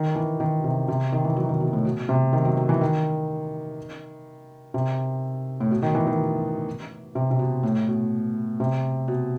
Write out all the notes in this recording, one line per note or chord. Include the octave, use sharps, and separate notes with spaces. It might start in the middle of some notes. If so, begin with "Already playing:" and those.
Already playing: D#3
E3
D#3
C3
C3
D#3
E3
F#3
D#3
B2
A2
B2
C3
D#3
F#3
F#3
E3
D#3
C3
A2
B2
D#3
E3
D#3
C3
C3
B2
A2
B2
C3
B2